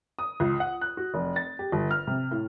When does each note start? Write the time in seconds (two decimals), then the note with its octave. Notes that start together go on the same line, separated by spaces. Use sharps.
0.19 D#6
0.40 C#2
0.60 F#5
0.81 F#6
0.97 F#4
1.14 F1
1.36 A6
1.59 G4
1.72 G1
1.91 F6
2.07 C3
2.31 A2